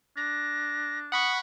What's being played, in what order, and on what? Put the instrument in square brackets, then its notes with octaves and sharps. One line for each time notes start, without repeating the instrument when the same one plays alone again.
[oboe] D4 [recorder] A#6
[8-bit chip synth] F#5 B5 C#6 [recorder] D#6